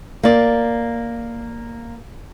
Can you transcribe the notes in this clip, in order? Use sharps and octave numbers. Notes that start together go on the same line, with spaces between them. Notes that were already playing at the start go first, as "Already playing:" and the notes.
A#3 D5